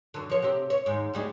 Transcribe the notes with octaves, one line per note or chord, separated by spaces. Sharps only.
F#2 D3
F3 C#5
C3 C4 G4
C#5
D#2 G#2
D2 G3 G#3